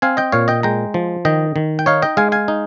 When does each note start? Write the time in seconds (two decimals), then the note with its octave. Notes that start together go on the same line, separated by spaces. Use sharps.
0.02 C4 F5 G#5
0.17 D#5 G5
0.32 A#2 C#5 F5
0.48 D#5 G5
0.63 G#3 G5 A#5
0.94 F3
1.25 D#3 D#5 G5
1.56 D#3
1.79 G5
1.86 D#4 C#5 F5
2.02 D#5 G5
2.17 G#3 F5 G#5
2.32 F5 G#5
2.48 D#4